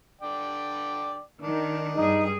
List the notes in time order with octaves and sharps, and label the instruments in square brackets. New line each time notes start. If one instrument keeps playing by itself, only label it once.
[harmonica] D3 D5 G5
[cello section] D#3 [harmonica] D4
[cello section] G2 G3 G#4 [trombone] D#4